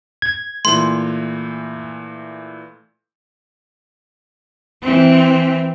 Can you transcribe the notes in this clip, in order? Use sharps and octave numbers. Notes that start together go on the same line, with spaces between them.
G#6
A#2 E3 A3 C6
E3 C4